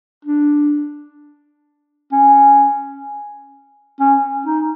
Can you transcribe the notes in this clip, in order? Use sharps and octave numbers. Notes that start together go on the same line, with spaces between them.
D4
C#4
C#4
D#4